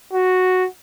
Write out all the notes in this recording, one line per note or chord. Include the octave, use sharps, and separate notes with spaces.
F#4